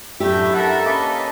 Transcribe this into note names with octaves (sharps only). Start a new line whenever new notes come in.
F#2 A2 A3 D4 E4 G4 E5 G6
A4 A#4 E5 F#5
A#3 C#4 A4 B4 D#5